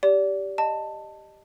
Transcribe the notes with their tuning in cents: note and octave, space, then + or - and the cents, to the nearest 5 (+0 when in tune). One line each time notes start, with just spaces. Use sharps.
G4 +0 D5 -25
D#5 -10 A5 +10